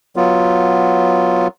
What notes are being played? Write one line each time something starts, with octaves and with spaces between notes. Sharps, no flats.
F#3 B3 F4